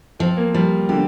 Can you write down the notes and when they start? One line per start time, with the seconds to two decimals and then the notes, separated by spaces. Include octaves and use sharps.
0.19 F3 C4
0.37 A#3
0.54 F3 G3
0.89 D3 G4